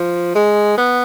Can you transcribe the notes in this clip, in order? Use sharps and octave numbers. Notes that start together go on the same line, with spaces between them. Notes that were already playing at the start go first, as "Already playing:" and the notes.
Already playing: F3
G#3
B3